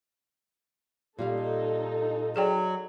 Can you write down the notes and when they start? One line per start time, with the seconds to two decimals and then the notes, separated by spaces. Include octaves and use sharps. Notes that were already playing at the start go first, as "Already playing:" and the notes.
1.19 A#2 G3 D#4 A4 F5
2.36 F#3 G#4 D5 G5